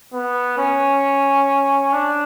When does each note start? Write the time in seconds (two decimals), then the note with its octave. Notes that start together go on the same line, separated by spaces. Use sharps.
0.13 B3
0.58 C#4
1.93 D4